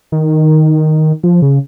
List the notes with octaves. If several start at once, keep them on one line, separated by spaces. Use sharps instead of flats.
D#3
F3
C#3